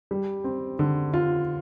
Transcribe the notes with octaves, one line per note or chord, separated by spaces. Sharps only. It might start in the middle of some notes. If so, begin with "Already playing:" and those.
G3
C4
D3
F4